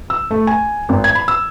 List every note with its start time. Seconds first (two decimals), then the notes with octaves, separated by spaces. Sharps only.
0.10 E6
0.31 A3
0.47 G#5
0.89 G#1
1.04 G#6
1.15 B5
1.28 E6